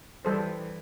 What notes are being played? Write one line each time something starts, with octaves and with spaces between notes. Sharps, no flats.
E3 G3 A4 C5